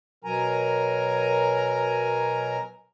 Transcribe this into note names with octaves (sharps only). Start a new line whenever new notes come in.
B2 F#3 A#4 G#5 A#5